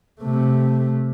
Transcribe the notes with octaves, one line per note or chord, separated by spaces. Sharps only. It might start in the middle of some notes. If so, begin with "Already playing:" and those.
C3 A3